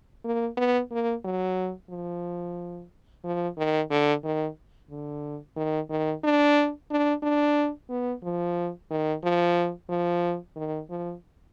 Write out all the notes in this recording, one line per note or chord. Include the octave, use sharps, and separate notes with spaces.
A#3
B3
A#3
F#3
F3
F3
D#3
D3
D#3
D3
D#3
D#3
D4
D4
D4
B3
F3
D#3
F3
F3
D#3
F3